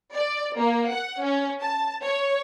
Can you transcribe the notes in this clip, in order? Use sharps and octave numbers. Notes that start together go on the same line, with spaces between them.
D5
A#3
F#5
C#4
A5
C#5